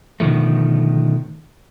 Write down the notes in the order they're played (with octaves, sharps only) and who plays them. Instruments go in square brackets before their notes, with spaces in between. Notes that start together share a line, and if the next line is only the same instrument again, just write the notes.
[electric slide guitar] B2 D3 D#3 F3 A3